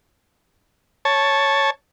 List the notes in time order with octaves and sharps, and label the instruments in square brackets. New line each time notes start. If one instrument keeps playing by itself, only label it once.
[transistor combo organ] C#5 A5